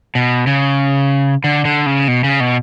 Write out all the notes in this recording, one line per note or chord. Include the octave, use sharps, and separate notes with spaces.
B2
C#3
D3
D3
C#3
B2
C#3
B2